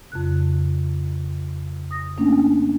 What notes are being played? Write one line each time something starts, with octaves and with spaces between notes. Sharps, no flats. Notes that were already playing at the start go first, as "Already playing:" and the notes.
F2 C#3 F#6
D#6 A#6
A3 A#3 C#4 D4